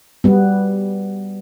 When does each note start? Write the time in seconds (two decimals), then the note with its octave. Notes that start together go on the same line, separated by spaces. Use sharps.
0.24 G3 B3